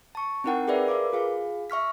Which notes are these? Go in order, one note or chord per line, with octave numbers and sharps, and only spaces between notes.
A5 C#6
C4 D#4 E4 A#4 F#5 G5
G#4 A#4 B4 D5 E5
A#4 B4 F5 D6
F4 G#4 F5
E5 C#6 F6 B6